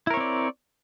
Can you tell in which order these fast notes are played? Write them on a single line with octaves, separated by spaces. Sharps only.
E4 A#4 C#5 C4 D5